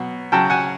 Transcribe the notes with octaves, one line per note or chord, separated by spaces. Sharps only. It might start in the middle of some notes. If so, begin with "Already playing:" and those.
Already playing: B2 F#3
C#3 F#3 G5 A5
F#5 G#5